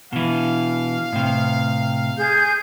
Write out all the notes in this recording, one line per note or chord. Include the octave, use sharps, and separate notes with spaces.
B2 E3 F5
A2 C3
G#4 G6